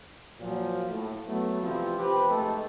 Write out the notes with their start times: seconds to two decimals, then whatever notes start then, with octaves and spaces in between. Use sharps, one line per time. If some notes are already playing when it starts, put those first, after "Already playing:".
0.40 A#2 F3 F#3
0.90 A2
1.27 F#3 A3 B3
1.62 C3 E3 F3 G3 C4
1.99 C3 F3 C4 G4 B4
2.30 F2 G#3 A3 D#4 G4 A4